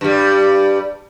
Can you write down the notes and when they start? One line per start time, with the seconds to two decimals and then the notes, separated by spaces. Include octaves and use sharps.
0.01 G2 G3